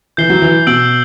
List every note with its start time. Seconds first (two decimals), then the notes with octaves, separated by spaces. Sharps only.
0.17 E3 G6 C7 G7
0.29 F#3
0.42 E3
0.67 B2 E6 G6 D7 F#7